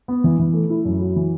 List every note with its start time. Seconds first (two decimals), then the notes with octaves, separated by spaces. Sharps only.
0.08 B3
0.24 E3
0.39 E3
0.54 A3
0.70 E4
0.85 F#2
1.01 F#4
1.16 E3